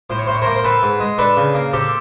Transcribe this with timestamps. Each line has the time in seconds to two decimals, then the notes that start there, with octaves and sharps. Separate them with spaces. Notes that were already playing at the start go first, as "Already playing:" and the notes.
0.10 A2 C5
0.18 C#5
0.26 A2 C5
0.35 C#5
0.42 A#4 C5
0.47 A#3
0.56 C5
0.64 C4 A4 B4
0.82 G#2
1.00 G#3
1.18 D4 A4 B4
1.37 C#3
1.54 A#3
1.73 C4 G4 A4